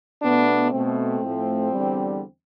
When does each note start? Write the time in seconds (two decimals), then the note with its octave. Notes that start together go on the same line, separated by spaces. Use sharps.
0.22 B2 A3 B3 D4
0.72 B2 A3 C4
1.22 A2 F3 A3
1.72 E2 D3 G3